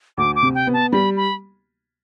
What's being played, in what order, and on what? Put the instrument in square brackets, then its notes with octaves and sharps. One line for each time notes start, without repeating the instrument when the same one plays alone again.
[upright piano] D2 [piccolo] D6
[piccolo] D6
[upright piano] C3
[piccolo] G5
[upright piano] B3
[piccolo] A5
[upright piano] G3 [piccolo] B5
[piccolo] B5